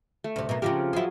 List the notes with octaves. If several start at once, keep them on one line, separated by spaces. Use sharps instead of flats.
A3
D2 C3
B2 A#3
C#3 F3 C4 G4 A#4
F3 F#3 E4 G#4